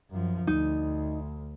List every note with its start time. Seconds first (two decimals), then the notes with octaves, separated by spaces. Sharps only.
0.10 F#2 F3
0.47 D2 D#4